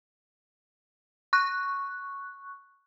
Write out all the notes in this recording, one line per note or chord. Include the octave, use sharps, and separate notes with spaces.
C#6 F#6